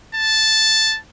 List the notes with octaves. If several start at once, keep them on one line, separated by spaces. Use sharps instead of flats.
A5